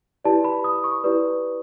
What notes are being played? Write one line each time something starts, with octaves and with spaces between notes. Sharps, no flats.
E4 G4 B4 D5 A5
B5
D#6
C#6
E4 G4 B4 D5